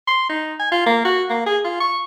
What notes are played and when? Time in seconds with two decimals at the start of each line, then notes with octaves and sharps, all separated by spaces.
0.08 C6
0.29 D#4
0.60 G#5
0.72 F4
0.87 A#3
1.05 F#4
1.30 A#3
1.46 G#4
1.65 F4
1.81 C#6